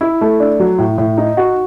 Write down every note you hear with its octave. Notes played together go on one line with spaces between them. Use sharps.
E4
A3
D4
F#3
A2
A2
D#4
F#4